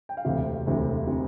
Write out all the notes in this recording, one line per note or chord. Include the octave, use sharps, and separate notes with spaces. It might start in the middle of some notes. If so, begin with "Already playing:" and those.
G5
F5
E1 D2 C3 E5
E1 D2 C3
C3